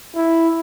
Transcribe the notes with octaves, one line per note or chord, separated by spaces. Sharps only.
E4